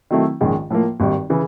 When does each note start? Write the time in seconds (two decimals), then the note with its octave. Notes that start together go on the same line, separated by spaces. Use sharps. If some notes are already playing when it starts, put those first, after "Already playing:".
0.11 D#3 F#3 A3 C4 E4
0.41 A#1 G#2 D#3 G#3 C#4
0.70 A2 F3 A#3
1.00 G#1 G2 D#3
1.30 C#3 E3